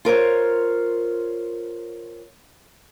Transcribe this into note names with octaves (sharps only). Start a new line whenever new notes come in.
F4 A#4 C5 C#5